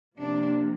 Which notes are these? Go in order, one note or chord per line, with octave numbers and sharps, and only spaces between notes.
C3 F3 A#3 D4